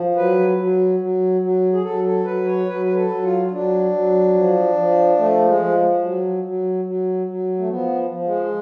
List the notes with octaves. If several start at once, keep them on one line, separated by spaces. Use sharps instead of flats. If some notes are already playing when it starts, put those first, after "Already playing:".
Already playing: F3
F#3 B4
F#3
F#3
F#3
G#4
F#3 A4
A4
F#3 B4
C#5
F#3 B4
B4
A4
F#3
F4
F4
F#3 D4
F#3
F3
F3
F3 A3
G#3
F3
F#3
F#3
F#3
F#3
A3
F3 B3
F3
G#3